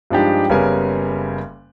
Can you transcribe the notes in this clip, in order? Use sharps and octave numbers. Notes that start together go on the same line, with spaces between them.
G2 F3 G#3 D4 D#4 G4
F#1 C#3 G3 B3 A#4 G#5